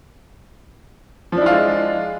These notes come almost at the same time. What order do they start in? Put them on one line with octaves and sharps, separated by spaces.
F3 D4 E4 F4 G#3